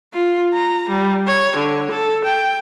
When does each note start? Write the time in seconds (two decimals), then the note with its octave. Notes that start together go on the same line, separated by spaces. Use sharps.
0.13 F4
0.53 A#5
0.89 G3
1.27 C#5
1.56 D3
1.91 A4
2.24 G5